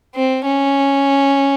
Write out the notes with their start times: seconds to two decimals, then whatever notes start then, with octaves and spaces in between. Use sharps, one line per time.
0.15 C4
0.46 C#4